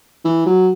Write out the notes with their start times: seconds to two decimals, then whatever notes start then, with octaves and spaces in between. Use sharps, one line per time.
0.25 E3
0.46 F#3